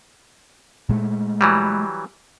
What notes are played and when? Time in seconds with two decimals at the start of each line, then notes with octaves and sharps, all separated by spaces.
0.89 A#2 G#3 A3
1.41 E3 F#3 G3